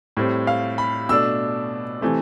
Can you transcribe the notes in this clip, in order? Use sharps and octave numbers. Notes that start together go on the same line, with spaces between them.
A2 G3 C4
F5
B5
B2 A3 D4 E6
C3 E3 A3 C4